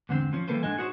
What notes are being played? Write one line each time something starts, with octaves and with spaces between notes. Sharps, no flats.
E2 G#2 D3 C4
F3 C#4
E3 G3 A#3 A4 B4 C5
G#2 G#3 D4 A4 D#5 G#5
D#4 F#4 G#4 A#4 C5 C#5